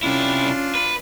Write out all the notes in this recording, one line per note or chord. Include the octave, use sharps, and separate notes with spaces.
C3 C#4 D4 E4 F4
B4